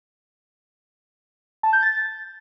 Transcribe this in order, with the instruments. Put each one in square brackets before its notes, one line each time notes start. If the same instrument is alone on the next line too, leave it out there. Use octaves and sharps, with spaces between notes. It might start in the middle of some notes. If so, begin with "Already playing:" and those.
[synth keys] A5
G6
A6